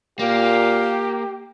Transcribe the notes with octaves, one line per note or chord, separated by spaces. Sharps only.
A#2 A#3 G4 F5